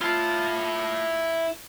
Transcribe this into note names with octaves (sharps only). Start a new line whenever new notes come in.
E4 F4 A5